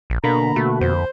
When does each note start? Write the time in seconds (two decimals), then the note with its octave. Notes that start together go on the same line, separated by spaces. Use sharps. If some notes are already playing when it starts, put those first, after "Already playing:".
0.10 A#1
0.24 B2 D3 A#3 A#5 B5
0.56 B2 A3 F#4
0.81 F2 C5